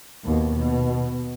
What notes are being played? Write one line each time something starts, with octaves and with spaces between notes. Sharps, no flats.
D#2 B2
B2